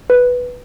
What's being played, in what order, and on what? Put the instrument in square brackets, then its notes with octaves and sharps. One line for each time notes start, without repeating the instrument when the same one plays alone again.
[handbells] B4